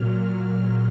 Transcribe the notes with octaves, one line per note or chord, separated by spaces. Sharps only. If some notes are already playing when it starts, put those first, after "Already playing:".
Already playing: A#2 F#3 F6
F6